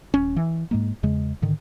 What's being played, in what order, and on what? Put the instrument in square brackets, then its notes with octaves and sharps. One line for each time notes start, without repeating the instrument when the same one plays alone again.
[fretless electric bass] D#1 C#4
E3
G#2 G#3 A#3
E2 C#3 G#3
G#2 D3 D#3